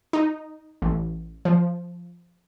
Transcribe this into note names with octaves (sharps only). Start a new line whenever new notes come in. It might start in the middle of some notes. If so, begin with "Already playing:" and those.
D#4
A1
F3